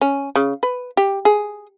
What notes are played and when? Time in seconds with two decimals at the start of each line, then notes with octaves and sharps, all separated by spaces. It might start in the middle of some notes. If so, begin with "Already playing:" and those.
0.01 C#4
0.36 C#3
0.63 B4
0.97 G4
1.25 G#4